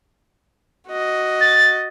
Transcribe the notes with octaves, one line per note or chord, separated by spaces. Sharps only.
F#4 D#5
A6